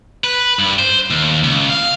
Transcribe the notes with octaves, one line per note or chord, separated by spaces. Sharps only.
B4
G2
C5
D#2
C#2
F5